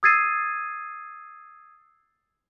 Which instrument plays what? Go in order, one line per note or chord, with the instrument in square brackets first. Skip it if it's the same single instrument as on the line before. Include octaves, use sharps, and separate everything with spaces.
[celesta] D#6 E6 G#6 A6 C7 D#7